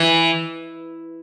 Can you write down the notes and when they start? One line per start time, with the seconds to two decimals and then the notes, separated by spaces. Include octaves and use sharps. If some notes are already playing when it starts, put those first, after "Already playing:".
Already playing: E3